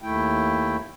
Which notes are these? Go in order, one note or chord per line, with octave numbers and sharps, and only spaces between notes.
D#2 A3 E4 G5